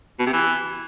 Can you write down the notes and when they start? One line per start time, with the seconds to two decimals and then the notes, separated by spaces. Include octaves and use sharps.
0.19 B2
0.26 C3
0.33 E3